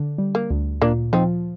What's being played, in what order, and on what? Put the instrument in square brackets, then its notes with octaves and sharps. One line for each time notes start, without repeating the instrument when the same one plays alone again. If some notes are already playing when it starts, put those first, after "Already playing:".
Already playing: [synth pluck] D3
G3
[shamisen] A#3
[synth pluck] D2
[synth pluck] A#2 [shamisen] A#3 D4
[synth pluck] F3 [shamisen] C4 D#4